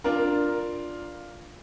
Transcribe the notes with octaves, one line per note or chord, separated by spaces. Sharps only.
D4 F4 A#4